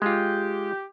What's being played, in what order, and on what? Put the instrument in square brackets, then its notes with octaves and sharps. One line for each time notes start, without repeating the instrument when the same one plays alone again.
[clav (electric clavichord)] G#3 F4 [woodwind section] G4